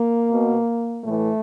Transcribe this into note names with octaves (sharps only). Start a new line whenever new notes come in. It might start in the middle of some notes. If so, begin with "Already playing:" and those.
Already playing: A#3
B2
A2 E3 A3